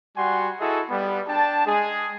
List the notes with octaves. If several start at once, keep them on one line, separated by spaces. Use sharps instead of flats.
G3 F#4 F#5 G#5 C6
E4 F#4 G#4 A4 D#5
G3 B3
D4 G5 A5
G#3 G#4